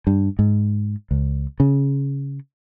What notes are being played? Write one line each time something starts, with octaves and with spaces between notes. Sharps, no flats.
G2
G#2
C#2
C#3